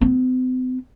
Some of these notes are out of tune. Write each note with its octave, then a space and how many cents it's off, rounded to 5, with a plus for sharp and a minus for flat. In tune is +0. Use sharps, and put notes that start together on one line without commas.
C4 -45